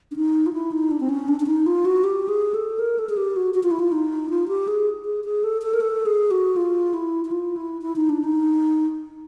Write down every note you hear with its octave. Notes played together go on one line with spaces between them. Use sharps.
D4
D#4
F4
E4
D#4
D4
C4
C#4
D4
D4
D#4
F4
F#4
G4
G#4
A4
A#4
A4
G#4
G4
F#4
F#4
F4
E4
F4
D#4
F4
G4
G#4
G#4
G#4
A4
A4
A#4
A4
G#4
F#4
F4
E4
E4
F4
E4
E4
D#4
D4
D#4